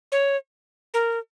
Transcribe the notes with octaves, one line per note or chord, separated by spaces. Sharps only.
C#5
A#4